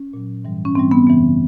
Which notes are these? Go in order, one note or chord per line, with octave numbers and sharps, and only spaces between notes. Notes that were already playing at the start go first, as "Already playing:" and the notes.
Already playing: C#4
A#2 F#3
G#2 E3 G3
C#4
G#2 E3 G3 C4
B3
F#2 C#3 E3 G3 B3